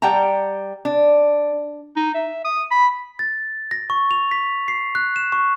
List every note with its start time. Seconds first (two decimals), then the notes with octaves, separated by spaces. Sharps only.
0.02 G3 F#5 G5 A5 A#5
0.85 D4
1.96 D#4
2.14 E5
2.44 D#6
2.71 B5
3.19 A6
3.71 A#6
3.90 C#6
4.11 F7
4.31 B6
4.68 C7
4.95 F#6
5.16 E7
5.32 C#6